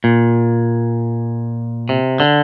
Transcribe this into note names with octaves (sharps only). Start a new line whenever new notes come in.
A#2
C3
D3